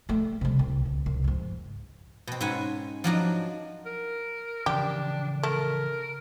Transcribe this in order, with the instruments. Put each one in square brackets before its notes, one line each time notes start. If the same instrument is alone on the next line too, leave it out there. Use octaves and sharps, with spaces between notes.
[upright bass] G3 A3
C3 G3
C2
C#2
C2
F2 G#2
[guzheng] B2 C4
G#2 C#4 B4 G#5
F3 F#3 D4 D#4
[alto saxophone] A#4
[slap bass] C#3 E3 F3 [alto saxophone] D4 [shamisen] G4
[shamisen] A3 [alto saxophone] A#4